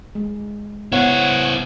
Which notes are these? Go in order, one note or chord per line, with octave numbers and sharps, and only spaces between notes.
G#3
B3 E4 C5 C#5 F#5